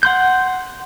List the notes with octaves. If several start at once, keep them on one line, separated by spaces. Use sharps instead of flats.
F#5 C6 G6